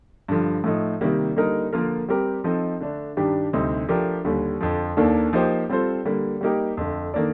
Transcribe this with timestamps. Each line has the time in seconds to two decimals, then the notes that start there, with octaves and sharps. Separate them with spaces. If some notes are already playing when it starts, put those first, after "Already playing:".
0.28 G2 D3 F3
0.64 A2 F3 A3 D#4
1.01 C3 D#3 G3 A#3
1.36 D3 G3 A#3 D#4 A#4
1.73 D3 F3 A#3 F4 A#4
2.08 G3 C4 G4 A#4
2.44 F3 C4 D#4 A4 D#5
2.80 D3 A3 D4
3.17 G2 D#3 G3 D4 G4
3.53 D2 C3 G3 C4 D#4
3.88 F3 A3 D4 G4 A#4
4.24 D#2 D3 G3
4.61 F2 D3 F3
4.97 D#2 D#3 A#3 D4 A4
5.33 F3 A#3 D#4 G4 C5
5.69 G3 C4 F4 A4 C5
6.05 D3 G3 A#3
6.41 G3 A#3 D#4 G4 A#4
6.77 F2 D3 A3
7.14 D#3 A#3 D4 A4 D5